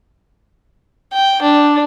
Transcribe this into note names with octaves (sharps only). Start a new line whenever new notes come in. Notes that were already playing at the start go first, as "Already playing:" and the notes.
G5
D4